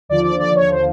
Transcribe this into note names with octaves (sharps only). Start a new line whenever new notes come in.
D#2 D3 F3 D5
D5
D5
C#5
C5